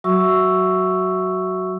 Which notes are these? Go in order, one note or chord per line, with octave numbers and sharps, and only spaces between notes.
F#3 F#4 E5 C#6 E6